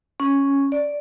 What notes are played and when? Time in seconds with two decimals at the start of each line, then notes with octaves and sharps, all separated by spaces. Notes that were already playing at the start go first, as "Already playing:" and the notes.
0.20 C#4
0.72 D5